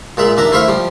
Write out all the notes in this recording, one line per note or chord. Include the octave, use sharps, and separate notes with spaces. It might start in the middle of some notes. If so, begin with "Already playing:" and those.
A#2 G#3 E5
D#2 D4 E5 A#5
A3 E4 C5 C#5 E5 F5
F3 G3